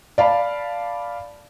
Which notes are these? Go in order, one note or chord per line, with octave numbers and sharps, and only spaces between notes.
D5 F5 A5 B5